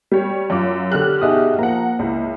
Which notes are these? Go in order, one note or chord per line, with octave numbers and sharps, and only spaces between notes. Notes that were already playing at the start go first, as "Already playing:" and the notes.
G3 C#5
F#2 F4 D6
D3 G4 F6 F#6
B2 D#4 G#4 E5 D#6
F3 A#3 F#5 A#5
C#2 E4